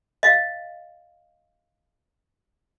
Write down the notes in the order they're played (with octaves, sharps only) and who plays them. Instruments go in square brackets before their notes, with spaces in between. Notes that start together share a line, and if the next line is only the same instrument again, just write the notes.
[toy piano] D#5 F5